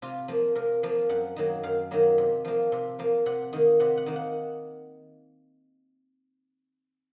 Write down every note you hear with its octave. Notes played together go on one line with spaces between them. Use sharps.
C3 F4
F3 A#3
C3 A#4
F3 A#3
F#2 F#5
D#3 F#3 A#3
F#2 F5
D#3 F#3 A#3
C3
F3 A#3
C3
F3 A#3
C3 F#5
D#3 A#3
C3 F#5
F#5
D#3 A#3
F#5